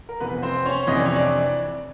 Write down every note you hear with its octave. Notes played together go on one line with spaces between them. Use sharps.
A#4
F2 C3 E3 B3 B4
C4 C5
C#4 C#5
F2 C3 E3 D#5
D5
C#5
D4 D5